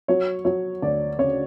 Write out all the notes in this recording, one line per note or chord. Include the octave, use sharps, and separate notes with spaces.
F#3 C#5
F#3 C#5
D2 D5
C#3 C#5